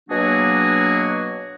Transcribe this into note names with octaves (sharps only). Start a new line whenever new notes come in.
B2 F#3 A#3 D4 F#4 G#4